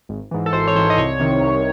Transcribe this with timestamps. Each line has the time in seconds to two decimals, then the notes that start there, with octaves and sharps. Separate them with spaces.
0.09 G#1
0.31 G#2 E3
0.46 A4
0.53 G#1 C5
0.67 C#5
0.76 G#2 E3 C5
0.90 D#5
0.98 C2 C#5
1.20 C3 D#3
1.41 C2